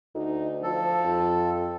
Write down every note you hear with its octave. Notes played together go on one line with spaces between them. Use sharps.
D2 D#4
F3 A4
F2